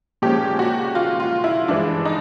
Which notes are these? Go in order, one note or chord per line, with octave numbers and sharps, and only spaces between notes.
A#2 F3 G#3 C#4 G4
F#4
F4
F4
E4
G2 E3 G#3 D4
D#4